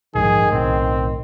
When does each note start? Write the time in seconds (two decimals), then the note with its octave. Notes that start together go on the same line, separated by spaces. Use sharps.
0.15 A#1 F2 G#2 D#3 G#4
0.52 B1 A2 C4